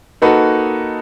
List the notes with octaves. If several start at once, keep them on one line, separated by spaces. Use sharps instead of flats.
A#3 D#4 F#4 A4 B4